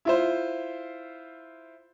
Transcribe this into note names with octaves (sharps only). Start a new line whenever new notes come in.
E4 F4 C5